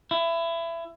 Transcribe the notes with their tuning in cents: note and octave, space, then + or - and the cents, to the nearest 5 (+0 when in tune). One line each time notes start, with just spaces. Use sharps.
E4 +25